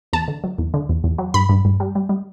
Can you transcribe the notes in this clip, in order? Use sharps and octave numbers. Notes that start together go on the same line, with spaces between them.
E2 A5
D3
F#3
E2
D3
E2
E2
F#3
G2 B5
G2
G2
G3
G3
G3